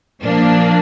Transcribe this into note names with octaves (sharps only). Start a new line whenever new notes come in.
A#2 F3 A#3 D4